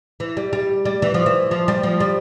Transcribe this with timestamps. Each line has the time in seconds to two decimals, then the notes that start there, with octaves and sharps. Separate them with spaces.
0.20 E3
0.37 G3
0.53 G3
0.85 G3
1.02 E3
1.14 F3
1.26 E3
1.51 F3
1.68 G3
1.83 F3
2.00 G3